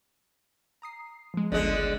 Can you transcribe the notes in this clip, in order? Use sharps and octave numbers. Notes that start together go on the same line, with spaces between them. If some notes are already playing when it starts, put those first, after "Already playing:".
A#5 D#6 C7
F3 G#3
G1 C#2 D3 G#3